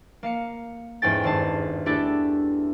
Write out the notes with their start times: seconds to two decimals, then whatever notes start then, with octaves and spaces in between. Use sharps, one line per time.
0.23 A#3 F5 C#7
1.02 E2 G#2 C#4 A4 G5 A6
1.24 G#1 G2 G#3 A5 C7
1.86 A3 D4 E4 G4 A4